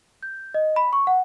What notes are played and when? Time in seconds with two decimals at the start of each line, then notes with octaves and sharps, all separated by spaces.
0.23 G6
0.54 D#5
0.76 B5
0.93 C#6
1.07 F#5